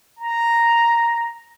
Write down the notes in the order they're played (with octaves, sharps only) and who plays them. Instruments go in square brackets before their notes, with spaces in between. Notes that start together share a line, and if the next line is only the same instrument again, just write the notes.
[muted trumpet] A#5